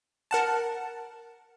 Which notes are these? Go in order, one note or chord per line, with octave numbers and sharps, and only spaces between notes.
A#4 F#5 A5